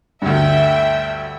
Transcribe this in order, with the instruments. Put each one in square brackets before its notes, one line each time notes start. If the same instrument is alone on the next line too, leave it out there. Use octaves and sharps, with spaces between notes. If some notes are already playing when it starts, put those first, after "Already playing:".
[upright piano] D2 G2 [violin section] E5 G5